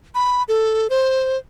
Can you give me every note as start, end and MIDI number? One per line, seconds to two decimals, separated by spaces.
0.15 0.43 83
0.48 0.88 69
0.90 1.38 72